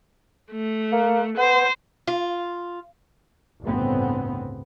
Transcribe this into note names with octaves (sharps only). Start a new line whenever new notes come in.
A3
A#3
B3 C5
F4
G1 D2 A2 C#3 B3 C4